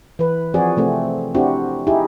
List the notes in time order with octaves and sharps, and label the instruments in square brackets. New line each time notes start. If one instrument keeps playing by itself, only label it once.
[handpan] E3 B4
F3 C4 F#4 G#4 D5
C3 A3 C4
C4 D4 E4 F#4 G4
D#4 E4 G4 G#4